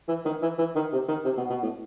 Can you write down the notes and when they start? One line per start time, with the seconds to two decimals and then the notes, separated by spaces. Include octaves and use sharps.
0.08 E3
0.25 D#3
0.42 E3
0.58 E3
0.75 D#3
0.92 C3
1.08 D#3
1.25 C3
1.37 B2
1.50 B2
1.63 A2